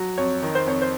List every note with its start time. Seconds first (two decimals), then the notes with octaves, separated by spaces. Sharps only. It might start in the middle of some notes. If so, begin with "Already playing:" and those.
Already playing: F#3
0.18 F2 C#5
0.42 D#3
0.55 C5
0.66 F2 C#5
0.82 C5